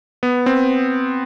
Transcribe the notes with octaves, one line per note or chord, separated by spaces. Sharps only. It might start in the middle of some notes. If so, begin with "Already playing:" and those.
B3
C4